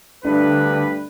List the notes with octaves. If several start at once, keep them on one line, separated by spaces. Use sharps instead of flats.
D2 G2 D3 B4